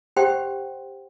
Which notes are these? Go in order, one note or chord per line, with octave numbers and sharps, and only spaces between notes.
G4 C5 F#5 G5 C6